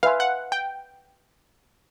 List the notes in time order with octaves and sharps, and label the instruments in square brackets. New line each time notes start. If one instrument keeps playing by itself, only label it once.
[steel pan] B4 E5 G#5 C6 [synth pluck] F5
[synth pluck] F#5
G5